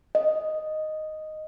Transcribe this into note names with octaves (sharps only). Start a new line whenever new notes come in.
D#5